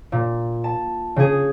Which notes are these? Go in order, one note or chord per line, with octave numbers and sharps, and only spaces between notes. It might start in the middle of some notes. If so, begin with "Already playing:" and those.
A#2
A5
C#3 G#4